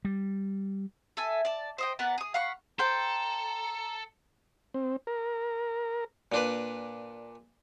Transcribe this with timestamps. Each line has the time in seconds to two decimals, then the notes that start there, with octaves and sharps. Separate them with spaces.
0.05 G3
1.17 A4 E5 G#5
1.45 D5 A5
1.78 C5 D#5 G5
1.99 B3 A#4 D5 F#5
2.18 G#4 D#6
2.34 F5 F#5 B5 C#6
2.79 A4 C5 G5 A#5
4.74 C4
5.07 A#4
6.32 A#2 D4 B4